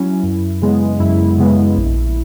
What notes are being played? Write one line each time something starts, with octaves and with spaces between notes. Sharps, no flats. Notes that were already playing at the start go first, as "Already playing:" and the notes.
Already playing: F#3 C#4 E4
F#2
C#3 G#3 B3
F#2 E4
C#3 G#3 B3
A#1